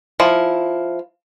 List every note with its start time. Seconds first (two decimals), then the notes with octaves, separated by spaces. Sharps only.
0.20 F3 E4